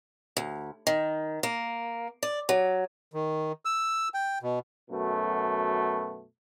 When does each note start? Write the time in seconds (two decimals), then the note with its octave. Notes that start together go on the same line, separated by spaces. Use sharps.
0.37 D2
0.87 D#3
1.43 A#3
2.23 D5
2.49 F#3
3.13 D#3
3.65 E6
4.14 G5
4.42 B2
4.90 F#2 B2 A3